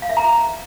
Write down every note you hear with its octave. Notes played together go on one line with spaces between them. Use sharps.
F5
E5
A#5